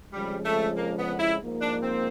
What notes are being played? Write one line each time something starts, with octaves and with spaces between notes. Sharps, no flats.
F2 C#3 F3 G3 G#3
A3
A#3
B3
E4
G#2 F3 A#3
D4
C4